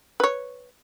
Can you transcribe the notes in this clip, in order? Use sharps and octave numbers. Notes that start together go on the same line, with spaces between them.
B4 C#5